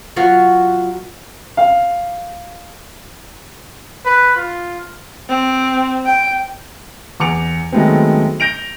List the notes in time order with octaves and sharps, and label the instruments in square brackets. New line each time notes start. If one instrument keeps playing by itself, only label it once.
[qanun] F#3 F4 F#4
[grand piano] F5
[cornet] B4
F4
[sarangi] C4
G5
[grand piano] E2 D6 C#7 F7
D#3 F#3 G#3 A3 B3 C4
G6 A#6 D7 F7